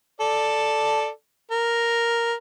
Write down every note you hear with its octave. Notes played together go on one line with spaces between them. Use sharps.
A4 D5
A#4